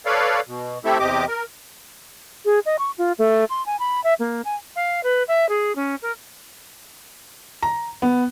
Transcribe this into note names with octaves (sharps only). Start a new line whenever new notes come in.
A4 B4 C#5 D5 F5
B2
A3 C4 E4 G4 A4 E5
E2 C3 G4 D#5 D6
A#4
G#4
D#5
C#6
F4
A3
C6
G#5
B5
E5
A#3
G#5
F5
B4
E5
G#4
C#4
A#4
A#5
B3